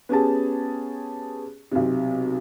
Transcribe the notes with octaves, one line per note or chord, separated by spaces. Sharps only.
B3 C#4 G4 G#4 A5
B1 C3